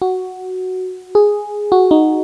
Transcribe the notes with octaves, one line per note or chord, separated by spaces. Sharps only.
F#4
G#4
F#4
D#4